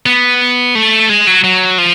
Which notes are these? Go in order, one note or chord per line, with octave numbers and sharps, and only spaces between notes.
B3
A3
G#3
F#3
F#3
F3